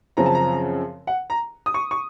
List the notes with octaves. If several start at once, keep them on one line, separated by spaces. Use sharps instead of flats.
F#2 C#3 F3 C4 A#5
A5
A#5
F#5
A#5
D#6
C#6
C#6